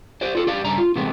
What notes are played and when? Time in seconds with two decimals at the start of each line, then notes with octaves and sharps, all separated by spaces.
0.21 G4 C5 D5
0.35 F4 A4
0.47 G4 D5 F5
0.64 G2 C#3 D4 A#5
0.78 F4
0.96 C3 E3 G#3 A3 B3 C4